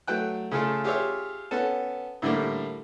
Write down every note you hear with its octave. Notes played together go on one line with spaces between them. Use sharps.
F#3 A3 G5 F#6
C#3 A3 F4 G#4 A4
F4 G4 G#4 C#5 E5
B3 C#4 A4 A5
A2 D3 G3 A3 A#3